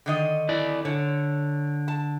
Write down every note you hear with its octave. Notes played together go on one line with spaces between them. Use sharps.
D3 D#3 D#5
E4 D5
D3 C#5
A5